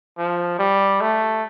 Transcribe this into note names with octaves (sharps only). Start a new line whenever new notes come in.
F3
G3
A3